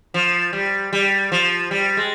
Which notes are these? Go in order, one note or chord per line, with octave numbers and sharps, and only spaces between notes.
F3
G3
G3
F3
G3
G#3